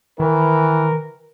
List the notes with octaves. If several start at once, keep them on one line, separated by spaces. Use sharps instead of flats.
D#3 E3 A#4